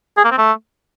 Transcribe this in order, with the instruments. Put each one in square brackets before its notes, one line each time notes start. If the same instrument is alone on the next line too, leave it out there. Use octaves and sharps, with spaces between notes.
[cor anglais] G#4
A#3
C4
A3